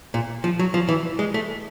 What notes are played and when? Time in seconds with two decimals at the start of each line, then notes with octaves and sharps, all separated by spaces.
0.14 A#2
0.44 F3
0.59 F#3
0.74 F3
0.89 E3
1.19 G#3
1.34 A3